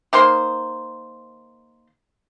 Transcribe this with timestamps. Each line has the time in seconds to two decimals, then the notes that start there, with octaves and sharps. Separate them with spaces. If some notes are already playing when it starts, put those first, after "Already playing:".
0.13 D#3 A#3 C5 C6